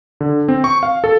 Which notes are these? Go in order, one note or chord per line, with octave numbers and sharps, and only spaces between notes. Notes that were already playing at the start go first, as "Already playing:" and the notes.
D3
C4
C#6
F5
A4